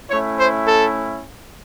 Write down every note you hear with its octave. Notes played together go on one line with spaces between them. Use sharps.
A3 C#4 E4 C#5
C5
A4